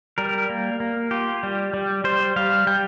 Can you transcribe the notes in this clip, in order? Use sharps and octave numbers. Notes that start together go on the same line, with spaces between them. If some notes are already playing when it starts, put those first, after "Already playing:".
G3 A#4
A#3
A#3
F4 G4
G3
G3
G3 C5
G3 F5
G3 G5